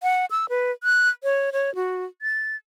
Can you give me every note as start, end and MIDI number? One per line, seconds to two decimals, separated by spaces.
0.03 0.25 78
0.31 0.49 88
0.49 0.71 71
0.84 1.09 90
1.23 1.50 73
1.53 1.74 73
1.75 2.05 66
2.22 2.56 93